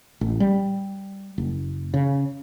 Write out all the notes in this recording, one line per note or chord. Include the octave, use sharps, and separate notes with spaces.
A1
G3
F#1
C#3